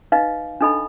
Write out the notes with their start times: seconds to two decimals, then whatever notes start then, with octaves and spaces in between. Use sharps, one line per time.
0.12 D#4 B4 D#5 F5
0.61 D4 D#4 A4 D#5 B5